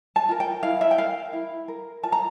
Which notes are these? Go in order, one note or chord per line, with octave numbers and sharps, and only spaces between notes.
A5
F4 A#4
G5
E4 F5
E5
G5
A#4 F5
E4
A#4
F4 A5
A#5